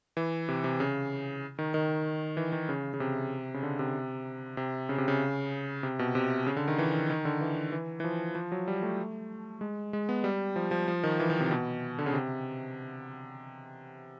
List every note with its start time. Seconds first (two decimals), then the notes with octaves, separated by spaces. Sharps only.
0.17 E3
0.49 C3
0.64 C3
0.80 C#3
1.59 D#3
1.74 D#3
2.37 E3
2.52 D#3
2.69 C#3
2.94 C#3
3.00 C3
3.54 C#3
3.63 D3
3.79 C3
4.57 C3
4.89 C#3
4.98 C3
5.08 C#3
5.83 C3
5.99 B2
6.15 C3
6.47 C#3
6.56 D3
6.68 D#3
6.78 E3
6.93 D#3
7.10 D#3
7.25 D3
7.41 E3
7.72 E3
8.00 E3
8.04 F3
8.35 F3
8.52 F#3
8.68 G3
8.83 A3
9.61 G#3
9.93 G#3
10.09 B3
10.24 G3
10.56 F3
10.71 F3
10.88 F3
11.03 D#3
11.20 E3
11.30 D#3
11.40 C3
11.51 B2
11.99 D3
12.06 C#3
12.14 C3